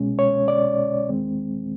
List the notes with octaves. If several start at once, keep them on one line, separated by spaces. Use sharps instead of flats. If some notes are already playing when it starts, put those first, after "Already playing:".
Already playing: C2 B2 G#3 C#4
C#5
D5
D#2 D#3 G#3 C4